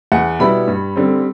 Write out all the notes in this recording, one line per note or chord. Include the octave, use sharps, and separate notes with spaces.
E2 F#5
B2 G3 B3 E4 B5
G2
D3 G3 C4